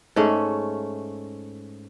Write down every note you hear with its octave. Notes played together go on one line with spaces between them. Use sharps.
G#2 A3 C#4